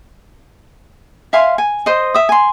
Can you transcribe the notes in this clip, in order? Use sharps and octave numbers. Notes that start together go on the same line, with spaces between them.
E5 F5 G#5 C6
G#5
C5 D#5
E5 D#6
G#5 C6